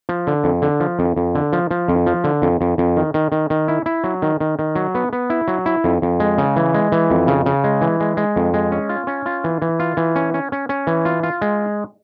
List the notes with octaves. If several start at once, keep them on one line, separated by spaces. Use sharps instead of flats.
F3
D3
F2
D3
F3
F2
F2
D3
F3
F3
F2
F3
D3
F2
F2
F2
D#3
D#3
D#3
D#3
E4
E4
F#3
D#3
D#3
D#3
F#3
B3
B3
E4
F#3
E4
F2
F2
G#3
C#3
E3
G#3
E3
F2
C#3
C#3
G#3
E3
G#3
G#3
F2
G#3
C#4
F4
C#4
F4
E3
E3
F4
E3
C#4
C#4
C#4
C#4
E3
F4
F4
G#3